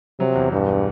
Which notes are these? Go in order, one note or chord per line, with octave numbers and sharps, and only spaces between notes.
C3 F#3
E2
E1 G2